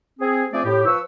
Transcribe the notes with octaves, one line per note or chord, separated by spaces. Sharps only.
C4 G#4
F3 A3 C4 G#4 D5
A2 G4
F3 B4 C#6 E6